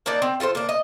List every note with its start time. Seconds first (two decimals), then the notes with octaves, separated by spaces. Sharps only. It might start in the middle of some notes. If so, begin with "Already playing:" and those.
0.06 A#3 D4 D#4 D5
0.22 C4
0.40 F4 A4 A#4 C5
0.55 A#3 D4
0.69 D#5